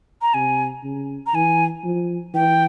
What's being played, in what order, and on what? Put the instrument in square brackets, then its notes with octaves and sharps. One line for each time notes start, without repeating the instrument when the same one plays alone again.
[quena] A#5
[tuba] C3 [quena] G#5
[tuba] C#3
[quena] A#5
[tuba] E3 [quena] G#5
[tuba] F3
[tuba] E3 [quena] G5